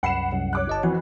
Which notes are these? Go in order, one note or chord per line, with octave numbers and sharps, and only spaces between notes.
C2 F#2 F#5 B5 C7 E7
C2 F#2
C#5 D6 F#6
G1 D#5 A5
F2 E3 F3 F#4